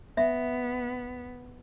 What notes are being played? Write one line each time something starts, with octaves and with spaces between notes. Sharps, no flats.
B3 E5